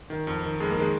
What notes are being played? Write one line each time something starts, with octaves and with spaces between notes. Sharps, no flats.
D#3
F2
D#3
F2 G#3
A#3
D#3 G#3